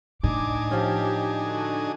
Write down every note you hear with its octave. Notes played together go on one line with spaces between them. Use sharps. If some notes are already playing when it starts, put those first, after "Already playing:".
A2 D4 D#4 G#5 D6
F3 C#4 G4
D3 F#4